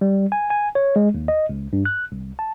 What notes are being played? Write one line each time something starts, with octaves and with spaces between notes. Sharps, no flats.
G3
G#5
G#5
C#5
G#3
D#2
D#5
C#2
G2
F#6
C2
A5